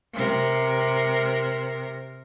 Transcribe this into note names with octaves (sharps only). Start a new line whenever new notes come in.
C3 A#4